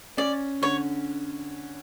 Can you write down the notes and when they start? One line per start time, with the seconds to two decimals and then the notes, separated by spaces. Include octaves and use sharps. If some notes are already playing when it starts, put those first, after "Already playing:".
0.17 C#4 D5
0.62 D3 C#5